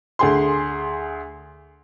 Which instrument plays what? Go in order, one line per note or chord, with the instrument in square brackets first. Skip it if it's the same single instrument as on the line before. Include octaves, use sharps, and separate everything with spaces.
[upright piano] D2 G#4 C6